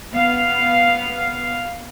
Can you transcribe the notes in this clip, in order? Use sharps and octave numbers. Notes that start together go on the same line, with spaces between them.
B3 F5